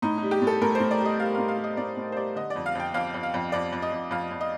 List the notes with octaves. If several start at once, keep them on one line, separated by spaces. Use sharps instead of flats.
A2 D#4
D#4
G3
G4
A2
A4
A2 A#4
A2 C5
D5
G3
D#5
G3 F5
A2 F5
F5
G3
D#5
A2 D5
A2
C5
G3 D5
D3 D#5
D5
F2
F5
F2 G5
F2 F5
F2
F5
F2
F2 D5
F2
D#5
F2
F2 F5
F2
D#5